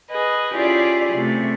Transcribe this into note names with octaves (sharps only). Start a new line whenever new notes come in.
G#4 B4 D#5
C#4 E4 F4 G4 G#4 D5
C3 A3